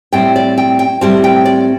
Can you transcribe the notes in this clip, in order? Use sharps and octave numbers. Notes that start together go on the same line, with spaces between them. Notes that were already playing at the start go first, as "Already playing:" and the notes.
A2 G3 C4 G5
D5
G5
G5
A2 G3 C4 A5
G5
D5